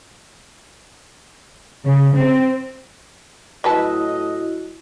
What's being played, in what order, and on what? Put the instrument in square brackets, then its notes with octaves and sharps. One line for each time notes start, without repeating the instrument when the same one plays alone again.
[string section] C#3
C4
[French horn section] A2 D#5 [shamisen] F#3 B4 A5 [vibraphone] E4 F#4